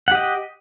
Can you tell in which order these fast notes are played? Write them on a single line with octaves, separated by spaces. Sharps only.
F#5 G4 D#5